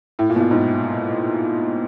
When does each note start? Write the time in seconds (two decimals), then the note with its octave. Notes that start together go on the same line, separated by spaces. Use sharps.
0.19 A2
0.30 A#2
0.36 B2
0.40 A#2
0.51 G#2